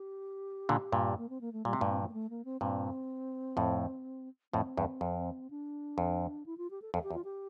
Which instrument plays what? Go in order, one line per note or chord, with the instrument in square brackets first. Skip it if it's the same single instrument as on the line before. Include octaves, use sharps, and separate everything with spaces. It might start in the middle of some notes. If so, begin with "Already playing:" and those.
Already playing: [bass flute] G4
[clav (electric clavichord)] A#2 D3
G2 A#2
[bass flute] A#3
C4
A#3
A3
[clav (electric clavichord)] A#2 [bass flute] G3
[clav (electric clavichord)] C3
[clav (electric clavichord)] G2 A#2 [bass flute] A3
[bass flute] C4
F3
A#3
A3
A#3
C4
[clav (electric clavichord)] G2 A#2 [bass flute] C4
[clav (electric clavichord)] F2 A2
[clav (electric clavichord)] F2 A2 [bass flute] C4
[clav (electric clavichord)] E2 G2
F2
[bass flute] D4
[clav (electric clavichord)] F2
[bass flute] E4
F4
G4
A4
[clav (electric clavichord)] F2 [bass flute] A4
[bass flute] G4
[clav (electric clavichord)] E2
[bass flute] F4
G4